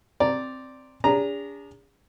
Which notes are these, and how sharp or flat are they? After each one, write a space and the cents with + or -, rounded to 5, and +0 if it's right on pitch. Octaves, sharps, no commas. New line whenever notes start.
C4 +0 D5 +0 A#5 +0
D4 -40 G#4 -35 A#5 +0